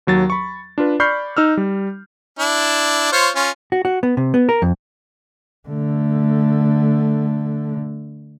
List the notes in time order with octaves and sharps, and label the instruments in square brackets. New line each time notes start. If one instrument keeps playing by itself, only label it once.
[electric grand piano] D#2 F#3 A6
B5 C#6
D4 F4 B4
D5 B5 C#6 F6 G6 C7
D#4 E6 F6
G3
[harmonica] D4 E4
F4 C5 C#5
C#4 F4
[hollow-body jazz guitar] F#4
F#4
B3
C3
B3
A#4
F2
[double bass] D3 A3